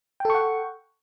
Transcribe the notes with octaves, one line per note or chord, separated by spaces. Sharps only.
A4 F#5 G5 C#6